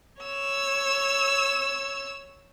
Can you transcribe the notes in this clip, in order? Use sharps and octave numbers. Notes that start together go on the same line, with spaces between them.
C#5 E6